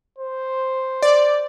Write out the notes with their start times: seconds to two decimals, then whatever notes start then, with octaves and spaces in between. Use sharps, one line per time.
0.18 C5
1.02 D5